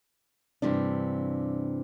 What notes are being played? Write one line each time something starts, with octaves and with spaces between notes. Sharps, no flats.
G2 C3 E3 D4